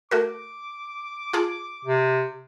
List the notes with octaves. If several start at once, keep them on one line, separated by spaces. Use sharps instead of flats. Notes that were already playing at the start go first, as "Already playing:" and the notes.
A3 F#4 A#4 D6
F4 G#4 A5
C3